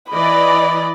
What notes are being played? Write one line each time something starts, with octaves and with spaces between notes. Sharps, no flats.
E3 D5 D#5 B5